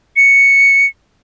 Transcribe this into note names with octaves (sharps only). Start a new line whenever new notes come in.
C#7